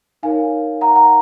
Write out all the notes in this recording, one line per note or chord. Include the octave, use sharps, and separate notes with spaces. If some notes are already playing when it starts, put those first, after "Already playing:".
D#4 A#4 C#5 F5 G#5
F#5 A#5
F#5 A#5